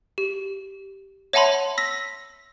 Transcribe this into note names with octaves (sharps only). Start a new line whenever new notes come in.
G4
C#5 E5 F#5 A5 B5 C6
E6 A#6 B6